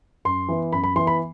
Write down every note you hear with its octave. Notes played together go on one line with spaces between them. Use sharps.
F#2 C6
E3 B3
F#2 B5
B5
E3 B3 C6
B5